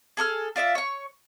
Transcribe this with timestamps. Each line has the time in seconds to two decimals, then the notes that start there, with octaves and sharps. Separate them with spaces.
0.17 G#4 A4 C#6 F6
0.56 F4 D5 E5 F5
0.75 C#5 C#6